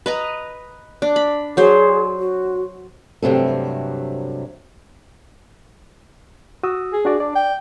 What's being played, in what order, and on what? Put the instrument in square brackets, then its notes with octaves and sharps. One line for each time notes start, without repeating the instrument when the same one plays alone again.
[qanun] B4 D#5 A#5
D4
B5
[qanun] F#3 C5 [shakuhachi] G#4
[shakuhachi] F#4
[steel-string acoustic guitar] G2 C3 F#3 A3
[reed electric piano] F#4 D#6 E6
[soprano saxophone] G#4
[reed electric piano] D4 F#4 D5
[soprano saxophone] D4 [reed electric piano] D5
[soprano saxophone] G5